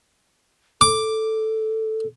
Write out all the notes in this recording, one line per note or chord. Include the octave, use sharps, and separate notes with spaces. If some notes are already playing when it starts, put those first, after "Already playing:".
A4 D6